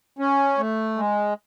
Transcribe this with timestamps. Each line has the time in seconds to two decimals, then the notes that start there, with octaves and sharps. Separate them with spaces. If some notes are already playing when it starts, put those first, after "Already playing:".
0.19 C#4
0.58 A3
0.97 G#3